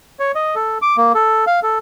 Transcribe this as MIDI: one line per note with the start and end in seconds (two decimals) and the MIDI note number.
0.20 0.32 73
0.35 0.55 75
0.55 0.78 69
0.82 0.97 86
0.97 1.12 58
1.15 1.45 69
1.47 1.60 77
1.63 1.78 69